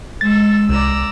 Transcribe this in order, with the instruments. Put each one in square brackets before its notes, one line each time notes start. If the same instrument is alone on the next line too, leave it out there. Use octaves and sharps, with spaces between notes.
[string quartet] G#3 E6 [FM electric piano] A6
[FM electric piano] C2 [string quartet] D5 A#5 E6